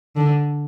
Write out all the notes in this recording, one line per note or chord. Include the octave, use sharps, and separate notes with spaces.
D3